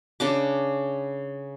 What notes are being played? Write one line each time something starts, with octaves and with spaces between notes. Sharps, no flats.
C#3 D4 D6